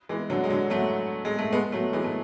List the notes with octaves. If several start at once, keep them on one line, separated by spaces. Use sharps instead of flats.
E3 G#3
D3 F#3
G#3
D3 F#3
F#3 A3
G#3
A3
G#3 B3
F#3 A3
E3 G#3
A3